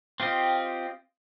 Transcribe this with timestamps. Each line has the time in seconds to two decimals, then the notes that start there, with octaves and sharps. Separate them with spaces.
0.20 C4 F4 G4 D#5